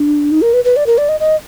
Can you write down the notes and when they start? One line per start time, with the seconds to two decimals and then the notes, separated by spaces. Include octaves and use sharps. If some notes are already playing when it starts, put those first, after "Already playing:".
Already playing: D4
0.31 D#4
0.42 A#4
0.53 B4
0.65 B4
0.76 D5
0.87 A#4
0.98 D5
1.09 D#5
1.20 D#5